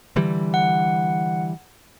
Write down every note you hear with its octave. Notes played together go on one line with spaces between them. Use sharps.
D3 E3 G3
F#5